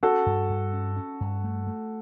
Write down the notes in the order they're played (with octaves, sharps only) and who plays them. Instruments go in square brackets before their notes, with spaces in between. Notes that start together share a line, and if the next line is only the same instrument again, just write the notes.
[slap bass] C#4 [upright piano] F#4 A4
[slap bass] G2
G2
C#4
C#4
G2
A3
A3